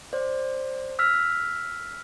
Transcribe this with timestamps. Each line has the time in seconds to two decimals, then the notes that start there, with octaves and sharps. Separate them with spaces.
0.13 C5 D5
0.99 E6 F6 B6